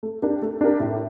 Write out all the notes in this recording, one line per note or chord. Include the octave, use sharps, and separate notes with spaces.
A3
D4 G4 A#4
A3
D4 G4 A#4
A2